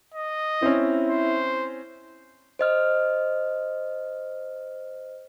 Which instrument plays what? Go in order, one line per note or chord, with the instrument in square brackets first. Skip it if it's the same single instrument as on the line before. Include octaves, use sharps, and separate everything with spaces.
[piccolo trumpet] D#5
[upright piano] C4 C#4 [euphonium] E4
[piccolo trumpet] C5
[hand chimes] C5 D#5 F6